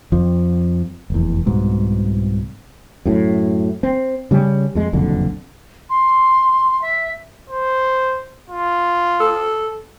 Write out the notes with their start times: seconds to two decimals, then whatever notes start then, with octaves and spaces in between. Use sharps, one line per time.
0.12 F2 F3
1.10 F1 E2
1.46 C2 G#2 B2
3.06 F#2 A2
3.83 C4
4.31 C#3 G3 B3 C#4
4.75 F2 G#3
4.93 F#1 B1 F2 D3
5.90 C6
6.82 E5
7.50 C5
8.50 F4
9.20 A4